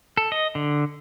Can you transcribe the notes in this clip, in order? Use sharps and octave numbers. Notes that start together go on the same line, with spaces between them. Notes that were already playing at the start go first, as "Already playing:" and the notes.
A4
D#5
D3